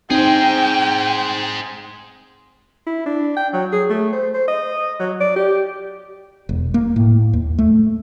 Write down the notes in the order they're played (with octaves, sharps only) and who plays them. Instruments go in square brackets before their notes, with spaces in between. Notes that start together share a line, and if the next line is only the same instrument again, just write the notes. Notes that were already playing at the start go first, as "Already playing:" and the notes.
[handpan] C4 D#4 [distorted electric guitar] G#4 C5 [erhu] G5
[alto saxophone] E4
D4
G5
F#3
G#4
A3
C5
C5
D#5
F#3
D5
G4
[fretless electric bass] E1
A#3
A2
D#2
A3